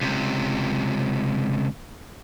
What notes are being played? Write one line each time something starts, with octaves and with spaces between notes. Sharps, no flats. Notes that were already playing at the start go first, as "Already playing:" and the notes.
C#2 C3